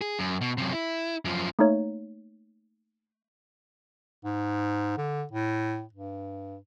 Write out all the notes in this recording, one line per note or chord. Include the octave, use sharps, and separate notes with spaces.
G#4
F#2
B2
F#2 C3
E4
F#2 F3
A3 A#3 D#4 C#5
G#2
D3
A2
G2